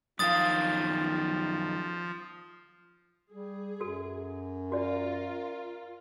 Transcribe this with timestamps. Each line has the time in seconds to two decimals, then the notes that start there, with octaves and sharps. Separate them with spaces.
0.19 F#2 D#3 F3 F5 D#6 A6
3.32 G3 G#4
3.81 F#2 F#4 A4
4.72 F4 F#4 A#4 D5